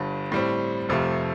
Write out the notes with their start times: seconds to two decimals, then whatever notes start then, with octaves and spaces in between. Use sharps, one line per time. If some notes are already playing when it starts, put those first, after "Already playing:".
Already playing: G1 G2 D3
0.32 A2 G3 C4
0.89 F1 F2 C3 F3 A3